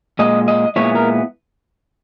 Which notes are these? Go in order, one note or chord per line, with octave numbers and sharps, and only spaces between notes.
A#2 G#3 D#5
D#5
A#2 G#3 B3 E4 C#5
A#4